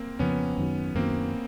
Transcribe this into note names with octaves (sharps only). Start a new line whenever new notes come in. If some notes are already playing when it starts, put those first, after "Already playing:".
Already playing: A#3 C4
F2 C#3 F3 B3 C#4
F#2 D#3 F#3
F#2 D#3 F#3 A#3 C4